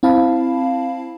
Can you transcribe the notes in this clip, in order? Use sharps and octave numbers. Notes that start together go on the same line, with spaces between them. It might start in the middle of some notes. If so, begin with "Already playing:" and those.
C4 E4 F5 A5 B5